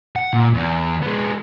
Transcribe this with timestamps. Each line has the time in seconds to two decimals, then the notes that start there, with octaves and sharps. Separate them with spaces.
0.16 F#5
0.33 A#2
0.54 E2
1.02 G#3 B3